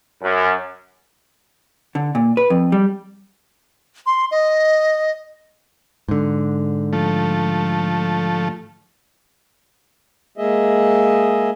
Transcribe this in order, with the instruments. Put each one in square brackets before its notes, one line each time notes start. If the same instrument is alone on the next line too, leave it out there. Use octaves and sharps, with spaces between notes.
[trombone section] F#2
[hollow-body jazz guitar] D3
A#2
B4
F2
G3
[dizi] C6
D#5
[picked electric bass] G#2 D3
[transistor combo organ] F3 A3
[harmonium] G#3 A#3 G#4 D#5 E5